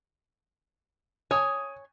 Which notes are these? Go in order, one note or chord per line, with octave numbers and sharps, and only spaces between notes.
C#5 G#5 D#6